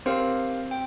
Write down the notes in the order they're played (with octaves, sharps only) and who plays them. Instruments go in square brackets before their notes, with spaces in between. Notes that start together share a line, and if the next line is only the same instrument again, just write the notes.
[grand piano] C4 [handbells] G4 A#4 F5
[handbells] G5